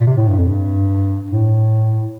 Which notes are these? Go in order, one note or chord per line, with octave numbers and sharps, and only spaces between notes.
A#2
C3
A2
G2
F2
G2
A2